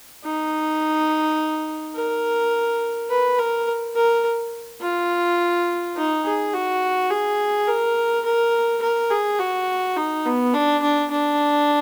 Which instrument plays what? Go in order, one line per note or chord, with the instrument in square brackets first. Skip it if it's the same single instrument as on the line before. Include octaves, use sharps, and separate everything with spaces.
[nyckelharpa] D#4
A#4
B4
A#4
A#4
F4
D#4
G#4
F#4
G#4
A#4
A#4
A#4
G#4
F#4
D#4
B3
D4
D4
D4